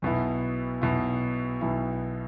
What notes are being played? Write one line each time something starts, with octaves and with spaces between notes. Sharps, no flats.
B1 B2 B3 E4
B1 B2 B3 E4
B1 B2 B3 E4